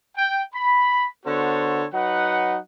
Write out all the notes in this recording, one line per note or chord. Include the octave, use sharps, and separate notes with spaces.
G5
B5
D3 B3 F#4 A4 C5 C#5
F#3 D#4 B4 F#5